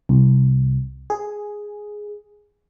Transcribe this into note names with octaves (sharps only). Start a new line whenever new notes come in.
C2
G#4